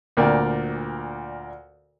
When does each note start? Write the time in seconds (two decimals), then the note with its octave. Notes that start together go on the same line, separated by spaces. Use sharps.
0.17 D2 A#2 A#4 D5 G5